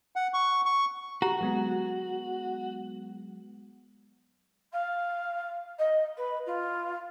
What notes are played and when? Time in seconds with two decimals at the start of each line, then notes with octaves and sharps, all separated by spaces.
0.16 F#5
0.34 C#6
0.66 C#6
1.22 F#4 G4 A#5
1.41 F#3 G#3 B3
4.72 F5
5.79 D#5
6.17 B4
6.46 F4